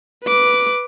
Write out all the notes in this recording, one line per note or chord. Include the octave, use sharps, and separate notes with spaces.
B4 D6